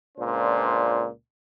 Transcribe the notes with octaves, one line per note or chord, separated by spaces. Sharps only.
C#2 A#2 D4 C5